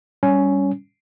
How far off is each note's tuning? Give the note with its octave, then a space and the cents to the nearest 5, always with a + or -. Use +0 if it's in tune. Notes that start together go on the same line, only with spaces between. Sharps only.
G3 +0 C#4 +10